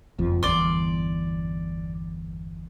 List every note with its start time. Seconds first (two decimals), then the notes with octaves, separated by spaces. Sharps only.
0.18 F#1 F2 F3
0.43 G1 E2 D5 C6